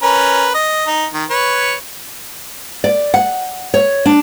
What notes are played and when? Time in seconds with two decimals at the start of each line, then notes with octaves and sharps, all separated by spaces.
0.02 C#4 A#4 B4
0.54 D#5
0.87 D#4
1.13 D#3
1.30 B4 C#5
2.84 D5
3.14 F#5
3.74 C#5
4.06 D4